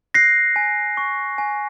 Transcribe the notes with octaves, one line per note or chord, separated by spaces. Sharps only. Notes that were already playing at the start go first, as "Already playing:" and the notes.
F#6 A#6 C7
G#5
C#6
G#5